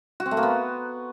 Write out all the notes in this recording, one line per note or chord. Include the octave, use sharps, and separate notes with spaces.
F#4
C4
A3
A#3
B3